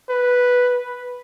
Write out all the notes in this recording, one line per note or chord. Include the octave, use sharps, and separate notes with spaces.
B4